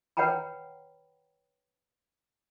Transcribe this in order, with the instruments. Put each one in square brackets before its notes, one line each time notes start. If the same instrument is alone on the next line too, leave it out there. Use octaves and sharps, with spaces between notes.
[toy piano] B4 C#5 F#5 G5 A#5 B5